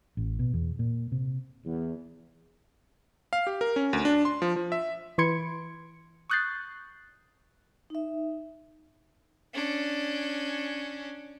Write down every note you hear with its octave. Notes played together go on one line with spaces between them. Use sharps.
A1
B2
E2
A#2
C3
E2
F5
G4
A#4
C#4
D2
D4
C6
F3
F3
E5
E3 B5 C6 G#6 C#7 D7
C#6 D#6 F#6 G6 A6 C7
D#4 E5
C#4 D4